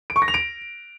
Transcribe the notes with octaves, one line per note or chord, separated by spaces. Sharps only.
D7
C#6
A#6
F7
D7